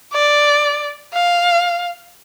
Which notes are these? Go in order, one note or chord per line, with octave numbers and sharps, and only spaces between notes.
D5
F5